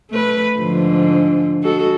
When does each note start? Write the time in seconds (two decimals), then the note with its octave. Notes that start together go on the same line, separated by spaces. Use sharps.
0.11 A3 B4
0.58 G#2 D3 F3
1.62 G#3 F#4 A4